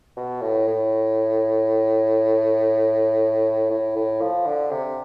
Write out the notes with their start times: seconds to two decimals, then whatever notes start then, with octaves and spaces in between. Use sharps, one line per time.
0.17 B2
0.42 A2
0.67 A2
3.70 A2
3.96 A2
4.21 F3
4.46 D3
4.71 C3